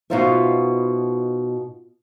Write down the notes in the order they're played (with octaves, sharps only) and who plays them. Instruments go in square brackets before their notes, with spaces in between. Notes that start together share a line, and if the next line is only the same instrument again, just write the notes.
[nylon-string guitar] B2 B3 D#4 F4 C5 E5